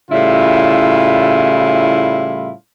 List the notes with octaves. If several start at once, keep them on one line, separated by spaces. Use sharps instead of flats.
A2 C#3 G3 E4 F4